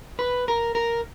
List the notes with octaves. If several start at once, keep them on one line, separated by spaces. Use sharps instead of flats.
B4
A#4
A#4